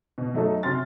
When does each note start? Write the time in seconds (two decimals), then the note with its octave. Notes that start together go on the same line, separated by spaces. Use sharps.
0.18 B2
0.34 F#3 A3 D#4 A4 D#5
0.63 C3 F#4 C6 F6 A6